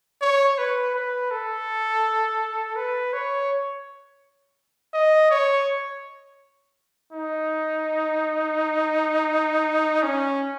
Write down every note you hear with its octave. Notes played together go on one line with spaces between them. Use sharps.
C#5
B4
B4
A4
B4
C#5
D#5
C#5
D#4
C#4